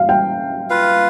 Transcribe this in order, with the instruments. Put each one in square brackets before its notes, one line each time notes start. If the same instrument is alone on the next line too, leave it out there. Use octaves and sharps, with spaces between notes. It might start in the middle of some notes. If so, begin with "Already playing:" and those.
Already playing: [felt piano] F5
G5
[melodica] F4 B4 F5